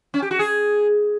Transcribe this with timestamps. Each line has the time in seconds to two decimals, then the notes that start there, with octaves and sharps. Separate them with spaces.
0.14 C#4
0.22 G4
0.31 F#4
0.39 G#4